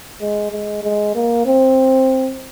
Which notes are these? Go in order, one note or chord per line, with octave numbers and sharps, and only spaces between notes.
G#3
G#3
G#3
A#3
C4